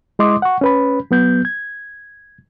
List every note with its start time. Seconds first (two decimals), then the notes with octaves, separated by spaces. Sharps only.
0.19 G#3 E4 D#5 C6 D6 D#6
0.42 F#5 C#6
0.61 C#4 B4 B5
1.11 F#3 B3 G6
1.45 G#6